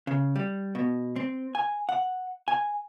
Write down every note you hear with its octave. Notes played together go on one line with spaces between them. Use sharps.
C#3
G3
B2
C4
G#5
F#5
G#5